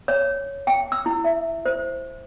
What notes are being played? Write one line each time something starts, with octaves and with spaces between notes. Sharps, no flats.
C#5
G5
E6
E4
E5
C5